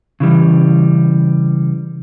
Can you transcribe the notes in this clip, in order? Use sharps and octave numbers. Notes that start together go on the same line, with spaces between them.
C#3 E3 G3